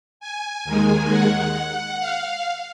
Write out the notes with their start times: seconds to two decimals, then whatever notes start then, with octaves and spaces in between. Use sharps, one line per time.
0.20 G#5
0.65 D#2 D#3 G#3
1.10 F#5
1.99 F5